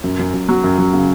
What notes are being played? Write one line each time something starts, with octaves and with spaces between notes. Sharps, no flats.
F#2
F#2
F#2
F#3
F#2
F#2
C#3